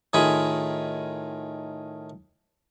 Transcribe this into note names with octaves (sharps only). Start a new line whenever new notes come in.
A2 D#3 F4 G#4 G#5 B5